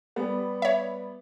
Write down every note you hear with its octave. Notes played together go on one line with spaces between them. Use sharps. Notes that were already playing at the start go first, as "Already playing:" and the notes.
G3 B3
C#5 E5